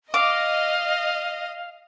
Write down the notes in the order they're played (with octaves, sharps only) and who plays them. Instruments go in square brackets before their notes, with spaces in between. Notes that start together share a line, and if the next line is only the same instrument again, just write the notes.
[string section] D#5 [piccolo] F5 [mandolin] D6